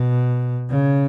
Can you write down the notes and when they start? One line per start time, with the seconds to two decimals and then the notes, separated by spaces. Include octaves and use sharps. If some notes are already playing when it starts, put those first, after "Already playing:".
Already playing: B2
0.69 C#3